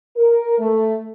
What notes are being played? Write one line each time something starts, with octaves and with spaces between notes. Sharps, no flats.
A#4
A3